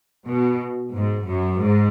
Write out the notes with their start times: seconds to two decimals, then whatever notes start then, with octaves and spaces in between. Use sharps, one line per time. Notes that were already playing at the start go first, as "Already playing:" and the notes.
0.27 B2
0.93 G#2
1.27 F#2
1.60 G#2